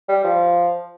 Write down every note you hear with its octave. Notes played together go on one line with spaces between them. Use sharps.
G3
F3